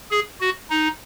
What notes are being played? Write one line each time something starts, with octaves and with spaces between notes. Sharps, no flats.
G#4
F#4
D#4